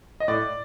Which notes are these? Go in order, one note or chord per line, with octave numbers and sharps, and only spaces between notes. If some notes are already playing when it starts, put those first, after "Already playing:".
D#5
A2 D5